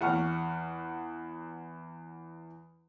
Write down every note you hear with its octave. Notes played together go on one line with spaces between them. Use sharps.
E2 F#5 C#6 F6